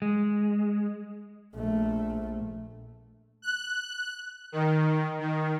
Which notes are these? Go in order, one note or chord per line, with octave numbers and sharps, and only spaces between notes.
G#3
A#1 A3
F#6
D#3
D#3